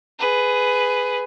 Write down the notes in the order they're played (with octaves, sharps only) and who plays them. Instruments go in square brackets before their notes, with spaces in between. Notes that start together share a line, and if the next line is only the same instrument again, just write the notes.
[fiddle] G#4 B4